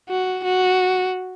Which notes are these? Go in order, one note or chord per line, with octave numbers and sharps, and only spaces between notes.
F#4
F#4